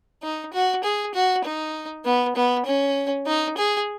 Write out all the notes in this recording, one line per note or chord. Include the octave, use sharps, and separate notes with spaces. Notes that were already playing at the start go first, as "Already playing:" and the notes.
D#4
F#4
G#4
F#4
D#4
B3
B3
C#4
D#4
G#4